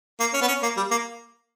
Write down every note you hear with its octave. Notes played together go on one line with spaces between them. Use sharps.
A#3
C#4
B3
C#4
A#3
G3
A#3